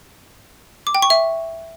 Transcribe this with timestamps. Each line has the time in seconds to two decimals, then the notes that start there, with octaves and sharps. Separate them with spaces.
0.87 D6
0.95 G5
1.02 C#6
1.10 E5